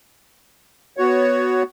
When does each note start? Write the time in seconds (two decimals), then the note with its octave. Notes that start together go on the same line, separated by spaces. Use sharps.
0.97 B3 F#4 C#5